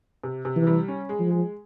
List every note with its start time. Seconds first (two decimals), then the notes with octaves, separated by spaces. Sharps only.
0.23 C3
0.45 C3
0.56 E3
0.67 G3
0.88 C#4
1.09 G#3
1.20 F3
1.30 G#3